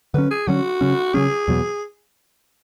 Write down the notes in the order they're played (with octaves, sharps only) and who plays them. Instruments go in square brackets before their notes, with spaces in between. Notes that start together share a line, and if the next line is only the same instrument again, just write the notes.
[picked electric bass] D3 F#3 C#4 [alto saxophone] B4
[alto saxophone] G#4
[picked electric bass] D3 F#3 C#4 [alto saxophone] F#4
[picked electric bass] C#3 F#3 C#4
[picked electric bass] C#3 F#3 C#4 [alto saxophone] G#4
[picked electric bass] E2 B2 F#3 B3